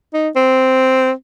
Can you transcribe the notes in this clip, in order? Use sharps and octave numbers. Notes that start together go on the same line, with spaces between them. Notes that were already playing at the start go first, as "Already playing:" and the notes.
D#4
C4